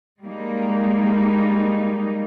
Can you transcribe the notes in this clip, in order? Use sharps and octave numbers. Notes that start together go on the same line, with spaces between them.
G3 G#3 A#3 D#4